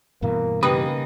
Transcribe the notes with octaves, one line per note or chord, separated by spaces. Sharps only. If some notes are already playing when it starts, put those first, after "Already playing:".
G2 B2 E3 A#3
C#3 A#3 D#4 G4 B4 D#6